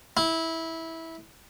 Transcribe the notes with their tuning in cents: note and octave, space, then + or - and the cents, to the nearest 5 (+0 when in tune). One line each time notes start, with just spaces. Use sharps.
E4 -15